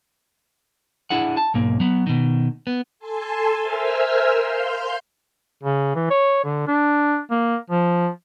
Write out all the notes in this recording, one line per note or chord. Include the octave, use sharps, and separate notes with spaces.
D4 E4 G#4 F#5
A5
B1 G#2 A#3
F#3 B3
B2 D#3
B3
A4 G#5 A5 C6
A#4 C5 E5 G#5 E6 F6
F5 C6 F6 G6
C#3
E3
C#5
D3
D4
A#3
F3